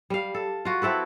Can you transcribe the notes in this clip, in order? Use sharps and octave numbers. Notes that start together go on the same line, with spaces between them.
G3 F5
A4
F4 F#4
C4 E4 A4 B4